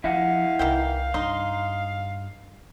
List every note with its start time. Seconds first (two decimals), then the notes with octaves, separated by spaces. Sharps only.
0.04 F3 E4 D#5 F5 F#5
0.59 C2 D#3 E3 G5
1.14 G2 D#4 C6